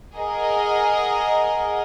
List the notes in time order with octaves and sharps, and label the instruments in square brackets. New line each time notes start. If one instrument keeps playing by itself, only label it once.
[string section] G#4 A#4 D#5 F#5